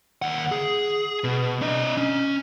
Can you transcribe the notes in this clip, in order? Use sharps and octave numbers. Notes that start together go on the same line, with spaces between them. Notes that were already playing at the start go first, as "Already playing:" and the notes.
D#2 F#5
G#4
B2
D4 D#5
C#4